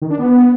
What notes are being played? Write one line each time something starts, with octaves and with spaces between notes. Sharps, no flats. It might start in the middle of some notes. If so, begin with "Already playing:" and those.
D#3
D4
B3